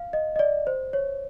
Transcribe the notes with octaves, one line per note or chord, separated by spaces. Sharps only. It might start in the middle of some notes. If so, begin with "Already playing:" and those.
Already playing: F5
D#5
D#5
D5
C5
C#5